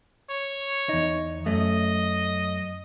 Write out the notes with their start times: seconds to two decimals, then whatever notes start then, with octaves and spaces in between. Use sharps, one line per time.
0.30 C#5
0.89 E2 D#4
1.46 F#2 A3 D#5